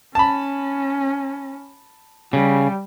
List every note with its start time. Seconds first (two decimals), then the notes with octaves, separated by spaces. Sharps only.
0.15 C#4 A5 B5
2.33 C#3 G3